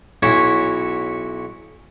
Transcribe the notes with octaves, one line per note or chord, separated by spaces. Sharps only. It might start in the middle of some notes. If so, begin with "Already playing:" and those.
B1 C#4 E4 F#4 C#5 E5